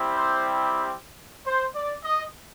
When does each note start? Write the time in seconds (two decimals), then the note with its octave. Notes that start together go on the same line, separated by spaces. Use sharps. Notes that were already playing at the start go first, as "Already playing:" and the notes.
Already playing: G3 C4 E4 G4
0.17 C5
1.46 C5
1.75 D5
2.04 D#5